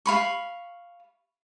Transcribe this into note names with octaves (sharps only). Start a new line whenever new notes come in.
F5 B5 C#6